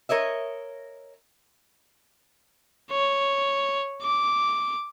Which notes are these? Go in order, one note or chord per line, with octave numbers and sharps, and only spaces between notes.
A#4 C#5 D#5 E5
C#5
D6